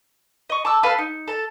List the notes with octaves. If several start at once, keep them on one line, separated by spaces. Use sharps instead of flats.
D#5 C#6
A5 D6 E6
A4 B4 F5 A5
D#4
A4 A5